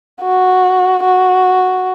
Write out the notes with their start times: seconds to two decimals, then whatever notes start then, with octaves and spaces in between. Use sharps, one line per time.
0.22 F#4
1.03 F#4